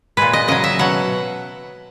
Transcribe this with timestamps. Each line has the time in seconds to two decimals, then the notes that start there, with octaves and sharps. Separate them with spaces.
0.17 A#2 G#3 B4
0.33 D#5
0.48 C#3 F#3 D#5
0.64 E5
0.79 B2 F#3 F#5